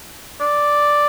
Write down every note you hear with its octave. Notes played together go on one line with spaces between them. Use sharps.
D5